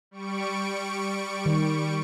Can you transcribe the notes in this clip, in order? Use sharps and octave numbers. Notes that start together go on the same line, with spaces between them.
G3 C#6 D7
D#3